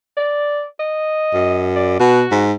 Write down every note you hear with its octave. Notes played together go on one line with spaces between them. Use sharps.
D5
D#5
F#2
D5
B2 F#4
G#2